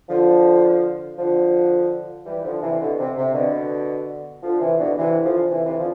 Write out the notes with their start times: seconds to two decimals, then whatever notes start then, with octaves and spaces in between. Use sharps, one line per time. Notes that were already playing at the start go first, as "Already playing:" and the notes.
0.09 D3 F3
1.18 D3 F3
2.25 E3 G3
2.44 D3 F3
2.61 C3 E3
2.80 B2 D3
2.98 C3
3.17 C3
3.34 B2 D3
4.43 D3 F3
4.61 C3 E3
4.78 B2 D3
4.97 C3 E3
5.23 D3 F3
5.50 C3 E3
5.64 C3 E3
5.78 D3 F3